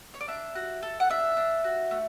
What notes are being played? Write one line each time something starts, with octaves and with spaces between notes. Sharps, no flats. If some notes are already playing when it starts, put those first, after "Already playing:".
C#5
D5
D4 E5
F#4
A4
F#5
D4 E5
D4
F#4
A3